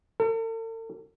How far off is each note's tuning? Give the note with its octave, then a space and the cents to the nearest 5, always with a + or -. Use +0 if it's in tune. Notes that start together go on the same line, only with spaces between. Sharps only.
A4 +45